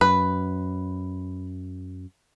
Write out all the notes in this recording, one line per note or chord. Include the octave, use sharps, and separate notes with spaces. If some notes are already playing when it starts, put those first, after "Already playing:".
F#2 B4